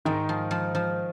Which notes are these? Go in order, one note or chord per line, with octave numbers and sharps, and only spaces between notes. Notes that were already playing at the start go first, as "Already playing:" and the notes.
G#2 D#3 D#4
F3
F3
F3